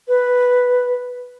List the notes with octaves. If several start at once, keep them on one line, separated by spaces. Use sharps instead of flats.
B4